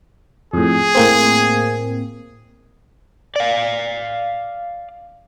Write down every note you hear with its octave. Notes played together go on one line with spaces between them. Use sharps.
F2 A2 G#4
A2 A#3 C4
D5 F5